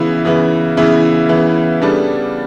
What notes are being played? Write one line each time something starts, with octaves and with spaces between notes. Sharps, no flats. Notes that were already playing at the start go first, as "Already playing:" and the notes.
Already playing: C#3 E3 B3 E4
C#3 E3 B3 E4
C#3 E3 B3 E4
C#3 E3 B3 E4
C#3 G3 B3 D4 A4